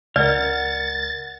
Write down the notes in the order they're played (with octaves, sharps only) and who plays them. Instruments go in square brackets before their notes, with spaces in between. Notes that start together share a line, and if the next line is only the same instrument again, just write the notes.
[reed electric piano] C#2 A#4 [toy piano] D5 [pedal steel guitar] F#5 F6 [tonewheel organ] A6